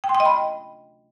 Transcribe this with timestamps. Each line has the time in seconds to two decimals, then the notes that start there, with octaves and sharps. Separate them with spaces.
0.04 G5
0.09 C6
0.15 G5
0.20 D#5
0.25 B5